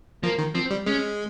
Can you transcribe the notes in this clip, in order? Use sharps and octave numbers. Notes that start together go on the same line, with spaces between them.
F3 A#3
D#3
F3 C4
G3
G#3 C#4